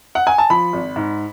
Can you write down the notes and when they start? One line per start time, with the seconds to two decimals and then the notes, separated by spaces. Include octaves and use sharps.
0.15 F#5
0.27 G#5
0.38 A5
0.50 F3 B5
0.73 G#1
0.96 G#2